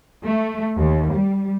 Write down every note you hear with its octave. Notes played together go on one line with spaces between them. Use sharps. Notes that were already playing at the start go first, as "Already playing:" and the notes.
A3
D#2
G3